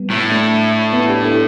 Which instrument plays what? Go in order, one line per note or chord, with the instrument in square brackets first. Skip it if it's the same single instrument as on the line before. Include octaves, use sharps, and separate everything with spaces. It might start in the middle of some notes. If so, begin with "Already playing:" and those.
Already playing: [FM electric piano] G3 B3
[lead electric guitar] A2
[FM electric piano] A3 D4
B3 E4
D4 G4
E4 A4